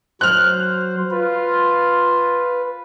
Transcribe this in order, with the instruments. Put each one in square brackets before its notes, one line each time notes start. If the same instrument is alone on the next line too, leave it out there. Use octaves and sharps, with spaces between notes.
[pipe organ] F#3 C5 [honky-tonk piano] F6 F#6
[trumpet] F4 [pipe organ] B4